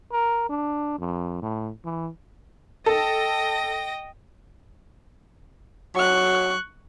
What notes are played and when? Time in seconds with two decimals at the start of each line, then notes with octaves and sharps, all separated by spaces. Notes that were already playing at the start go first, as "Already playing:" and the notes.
0.12 A#4
0.49 D4
0.99 F2
1.42 A2
1.85 E3
2.86 A4 D#5 G5 A#6
5.96 F#3 C#6 F#6